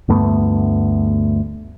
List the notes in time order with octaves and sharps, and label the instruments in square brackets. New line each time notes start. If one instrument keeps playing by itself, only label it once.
[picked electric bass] D2 G2 A3 B3